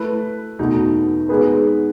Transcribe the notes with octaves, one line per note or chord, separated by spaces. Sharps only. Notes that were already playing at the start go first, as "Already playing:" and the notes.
Already playing: A3 E4 B4
E2 B2 A3 D#4
G#3 B3 D#4 G#4 B4